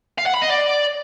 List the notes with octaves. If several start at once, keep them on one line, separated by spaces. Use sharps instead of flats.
F5
F#5
B5
D#5
D5